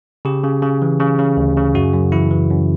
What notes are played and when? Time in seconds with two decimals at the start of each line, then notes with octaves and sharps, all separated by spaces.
0.25 C#3 G4
0.43 C#3
0.62 C#3
0.82 E3
1.00 C#3
1.18 C#3
1.37 D2
1.57 C#3
1.75 F#2 F#4
1.94 F#2
2.12 E3 E4
2.31 E3
2.51 F#2